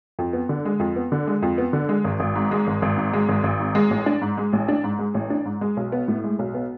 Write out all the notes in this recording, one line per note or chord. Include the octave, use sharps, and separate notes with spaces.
F2
B3
D3
G#3
F2
B3
D3
G#3
F2
B3
D3
G#3
G#1
G#1
G#2
G#3
G#1
G#1
G#2
G#3
G#1
G#1
G#2
G#3
A1
D4
G#2
G#3
A1
D4
G#2
G#3
A1
D4
G#2
G#3
B1
B3
A2
G#3
B1
B3